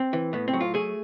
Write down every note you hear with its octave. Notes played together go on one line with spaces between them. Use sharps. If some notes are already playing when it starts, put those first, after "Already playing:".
Already playing: C4
E3
A2 B3
C4
F#3
F4
A3 G#4